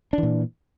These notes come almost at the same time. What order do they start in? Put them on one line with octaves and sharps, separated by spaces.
D4 E3 A#2